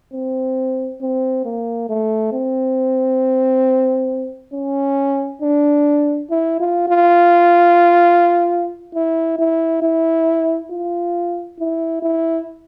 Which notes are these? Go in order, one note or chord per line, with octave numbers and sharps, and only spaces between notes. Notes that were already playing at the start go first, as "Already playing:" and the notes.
C4
C4
A#3
A3
C4
C#4
D4
E4
F4
F4
E4
E4
E4
F4
E4
E4